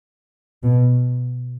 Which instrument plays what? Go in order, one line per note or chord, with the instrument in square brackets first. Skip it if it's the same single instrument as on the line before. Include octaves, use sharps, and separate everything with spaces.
[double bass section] B2